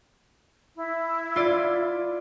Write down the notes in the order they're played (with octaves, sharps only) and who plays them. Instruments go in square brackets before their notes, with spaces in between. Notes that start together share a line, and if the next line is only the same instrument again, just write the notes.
[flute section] E4
[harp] F4 D5